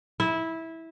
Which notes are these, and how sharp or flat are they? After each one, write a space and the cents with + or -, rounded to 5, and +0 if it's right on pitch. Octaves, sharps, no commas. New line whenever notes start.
E4 -15